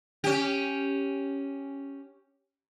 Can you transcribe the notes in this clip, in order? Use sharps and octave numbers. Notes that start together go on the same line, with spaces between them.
C#4 G4